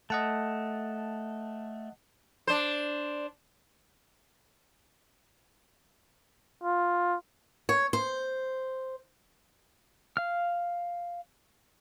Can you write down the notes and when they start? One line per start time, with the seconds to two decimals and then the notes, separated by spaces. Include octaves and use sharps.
0.10 A3 D#5 F#5 A5
2.47 D4 C5
6.63 F4
7.69 C#5
7.93 C5
10.17 F5 F6